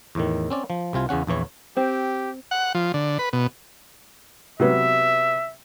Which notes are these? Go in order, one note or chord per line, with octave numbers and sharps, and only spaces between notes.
E2 A2 D#3
C4 C#4 D5
F3
C2 C3 F4 G#5
E2 C#3 C#4 F#5
A#1 E2 E3 C#5
C4 G4
F#5
F3
D3
B4
B2
C3 F#3 B3 E5